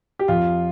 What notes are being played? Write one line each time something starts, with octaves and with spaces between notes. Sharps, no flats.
G4
F2 F4